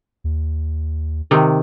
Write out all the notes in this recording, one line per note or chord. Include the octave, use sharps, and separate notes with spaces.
D#2
C3 D#3